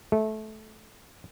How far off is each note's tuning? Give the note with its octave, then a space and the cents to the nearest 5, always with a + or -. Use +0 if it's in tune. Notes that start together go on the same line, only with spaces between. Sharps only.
A3 -20